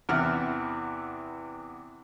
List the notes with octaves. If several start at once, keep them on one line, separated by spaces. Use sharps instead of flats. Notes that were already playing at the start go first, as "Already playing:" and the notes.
E2 C3 E3 E5 F#5 F6